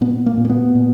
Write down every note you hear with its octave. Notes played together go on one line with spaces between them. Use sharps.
A#2 B3
A#3
A#2
A#3
B3
A#2